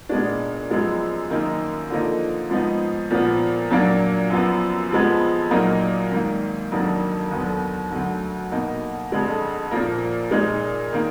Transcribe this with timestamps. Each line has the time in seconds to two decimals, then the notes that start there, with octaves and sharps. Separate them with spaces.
0.09 A#2 G#3 B3 D4
0.70 F#2 F3 G#3 B3
1.30 F#2 D#3 A#3 D#4
1.90 D3 F3 A#3 D#4
2.50 G#2 F3 B3 D#4
3.11 A#2 F3 B3
3.70 A#2 F#3 A#3 D4
4.30 F#2 F3 B3
4.91 F2 F3 G#3 B3
5.51 A#2 F#3 A#3 D#4
6.11 G#2 D#3 A#3
6.71 F2 D#3 F#3 A#3 D4
7.31 D#2 D3 F#3 B3
7.91 D2 D3 F#3
8.51 B2 A#3 D#4
9.12 F2 D3 G#3
9.71 A#2 F3 A#3
10.31 A#2 G#3 D#4
10.93 D#3 A#3